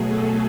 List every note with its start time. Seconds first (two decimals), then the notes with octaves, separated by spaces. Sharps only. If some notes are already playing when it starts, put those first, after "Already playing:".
Already playing: B2 F#3 A3 G#4
0.10 A4